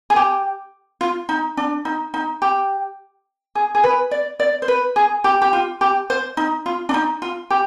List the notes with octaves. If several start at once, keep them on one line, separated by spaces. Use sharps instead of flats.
G#4
G4
F4
D#4
D4
D#4
D#4
G4
G#4
G#4
B4
D5
D5
C5
B4
G#4
G4
G4
F4
G4
C5
D#4
F4
D4
D#4
F4
G4